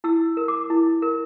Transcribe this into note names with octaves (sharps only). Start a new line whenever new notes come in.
E4 E6
A#4
D6
E4
A#4